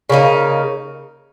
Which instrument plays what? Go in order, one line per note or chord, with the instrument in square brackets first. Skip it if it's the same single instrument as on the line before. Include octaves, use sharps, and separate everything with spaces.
[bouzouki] C#3 A#3 D#4